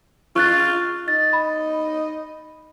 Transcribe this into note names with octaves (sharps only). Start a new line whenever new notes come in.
F4 C#6 F#6 A6
D#4 A6
B5